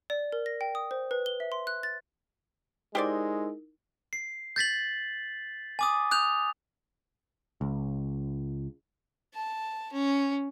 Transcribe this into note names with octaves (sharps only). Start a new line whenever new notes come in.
D5
A#4
A#6
G5
D#6
C5
B4
G7
E5
C6
F#6
A6
G#3 D#4 E4 G4 A#4 C5 D5
C7
G6 A6 B6 F#7
G#5 D6 D#6
D#6 F#6 G6 F7
C#2
A5
C#4